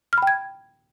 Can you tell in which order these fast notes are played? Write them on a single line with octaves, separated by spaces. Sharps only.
F6 B5 G5 G#6